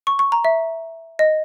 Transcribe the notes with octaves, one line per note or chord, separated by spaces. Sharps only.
C#6
C#6
A#5
E5
D#5